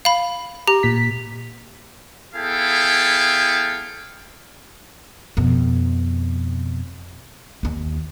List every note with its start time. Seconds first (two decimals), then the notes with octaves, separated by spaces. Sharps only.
0.05 F5 B5
0.68 G4 A#5
0.83 A#2 B6
2.34 B3 E4 G#4 A4 F5 G5
5.37 F2 B2
7.63 D#2 A#3